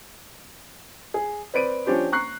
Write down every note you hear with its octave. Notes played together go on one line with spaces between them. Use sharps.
G#4
C4 B4 D5 D7 D#7
F3 C#4 D4 G4 C5
A#5 C#6 F#6 C7